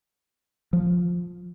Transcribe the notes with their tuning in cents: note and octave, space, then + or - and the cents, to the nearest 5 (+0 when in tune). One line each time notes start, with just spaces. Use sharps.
F3 +10